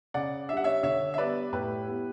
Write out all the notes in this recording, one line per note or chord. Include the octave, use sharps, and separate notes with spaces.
C#3 D5 F#5
G3 D4 E5 F#5
C#5 E5
D3 C#5 E5
E5
G3 B3 B4 D5
A2 G4 B4
G3 B3 E4